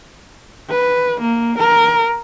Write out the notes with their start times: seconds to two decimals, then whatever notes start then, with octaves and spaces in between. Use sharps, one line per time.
0.70 B4
1.21 A#3
1.58 A#4